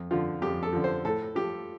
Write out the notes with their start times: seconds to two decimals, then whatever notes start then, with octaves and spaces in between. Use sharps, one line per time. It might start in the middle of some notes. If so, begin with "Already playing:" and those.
Already playing: F2
0.11 D3 F3 F4
0.42 F2 G4
0.63 A4
0.73 D3 F3
0.84 C5
1.05 A2 A4
1.35 F3 G4